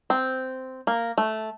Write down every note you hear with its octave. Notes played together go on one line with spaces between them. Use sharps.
C4
A#3
A3